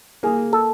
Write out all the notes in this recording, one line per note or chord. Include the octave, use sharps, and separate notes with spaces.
A#3 G#4
A4